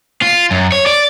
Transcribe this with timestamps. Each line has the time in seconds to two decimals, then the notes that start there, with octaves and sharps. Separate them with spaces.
0.22 F4
0.51 F#2
0.72 C#5
0.86 D5